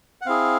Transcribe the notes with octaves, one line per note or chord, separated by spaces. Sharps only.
F#5
C4 E4 G#4 F5